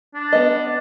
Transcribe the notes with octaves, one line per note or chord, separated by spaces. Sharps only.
D4
B3 D#5